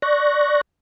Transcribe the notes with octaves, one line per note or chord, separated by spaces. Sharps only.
D5 C#6 F#6 A#6